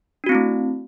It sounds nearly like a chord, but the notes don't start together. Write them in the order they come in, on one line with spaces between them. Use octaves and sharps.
D4 F#4 C4 E4 A3